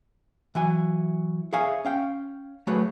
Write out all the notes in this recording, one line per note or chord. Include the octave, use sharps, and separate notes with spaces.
E3 F#3 G#5
G#4 C#5 E5 F5 G#5
C#4 F5 G5
F#3 A3 F#4 G#4 B4 C#5